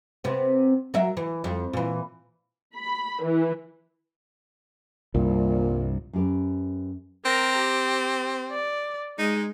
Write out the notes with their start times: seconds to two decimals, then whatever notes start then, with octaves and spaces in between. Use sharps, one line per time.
0.24 C3 B3
0.94 F#3 A#4 E5
1.17 E3
1.44 F2
1.73 A#2 E3
2.76 B5
3.23 E3
5.15 C2 G2 A#2
6.13 F#2 G4 B4
7.26 C4 A#4 A#5
7.58 G4
8.52 D5
9.19 G#3 D#4